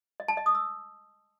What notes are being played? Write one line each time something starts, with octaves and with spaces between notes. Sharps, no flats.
D#5
A5
D#5
D#6
E6